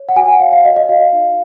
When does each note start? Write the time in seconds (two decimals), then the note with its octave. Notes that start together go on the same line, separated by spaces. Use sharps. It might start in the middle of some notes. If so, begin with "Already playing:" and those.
Already playing: C#5
0.09 F#5
0.16 F#4 G#5
0.28 F#5
0.40 C#5 F5
0.52 F5
0.65 F#4 D#5
0.76 D#5
0.89 F#4 F5
1.13 D#4